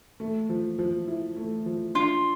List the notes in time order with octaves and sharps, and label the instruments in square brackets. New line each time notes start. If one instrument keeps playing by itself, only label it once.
[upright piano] A3
F3
F3
E4
A3
F3
[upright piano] D4 [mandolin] F4